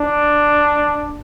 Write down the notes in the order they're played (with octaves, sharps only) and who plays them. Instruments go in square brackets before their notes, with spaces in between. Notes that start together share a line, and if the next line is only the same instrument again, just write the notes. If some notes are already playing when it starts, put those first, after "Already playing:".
Already playing: [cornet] D4